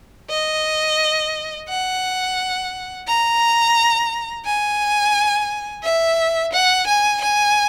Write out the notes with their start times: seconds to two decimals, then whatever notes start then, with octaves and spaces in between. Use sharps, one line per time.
0.30 D#5
1.69 F#5
3.08 A#5
4.46 G#5
5.83 E5
6.53 F#5
6.87 G#5
7.22 G#5